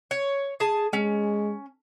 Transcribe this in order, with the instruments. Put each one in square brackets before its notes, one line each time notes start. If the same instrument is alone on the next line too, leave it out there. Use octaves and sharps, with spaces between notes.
[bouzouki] C#5
G#4 A5
[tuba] G#3 [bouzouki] C#4